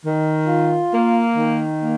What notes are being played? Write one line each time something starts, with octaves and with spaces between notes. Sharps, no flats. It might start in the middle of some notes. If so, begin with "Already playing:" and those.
D#3
F4
A#3
D#3
A#3